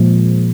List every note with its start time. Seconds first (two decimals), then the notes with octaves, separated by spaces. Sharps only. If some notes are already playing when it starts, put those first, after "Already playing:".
Already playing: A#2 F3 G#3